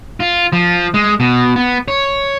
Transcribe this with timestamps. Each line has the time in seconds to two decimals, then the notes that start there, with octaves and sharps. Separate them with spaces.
0.20 F4
0.53 F3
0.94 G#3
1.20 B2
1.56 B3
1.88 C#5